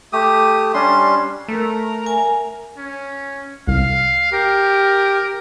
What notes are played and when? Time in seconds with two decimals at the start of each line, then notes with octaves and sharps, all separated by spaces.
0.13 A3 G4 D#6
0.74 G3 C#4 D4 C6
1.48 A3 A#4 A#5
2.06 G#5
2.77 C#4
3.67 C2 F5
4.32 G4 A#4